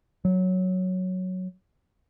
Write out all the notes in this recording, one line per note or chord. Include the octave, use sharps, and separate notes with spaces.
F#3